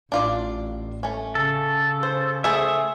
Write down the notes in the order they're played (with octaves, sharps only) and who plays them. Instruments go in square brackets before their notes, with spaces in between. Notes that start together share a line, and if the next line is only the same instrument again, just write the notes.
[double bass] A1 [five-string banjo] D4 F4 D5
[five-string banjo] A3 C#4
[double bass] C#3 [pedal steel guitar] A4
[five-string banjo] C5
[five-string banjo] A3 G#4 C5 [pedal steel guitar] E5